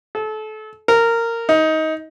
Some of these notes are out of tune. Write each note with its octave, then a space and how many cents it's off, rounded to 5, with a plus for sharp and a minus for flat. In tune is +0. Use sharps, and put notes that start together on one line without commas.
A4 -30
A#4 -15
D#4 +20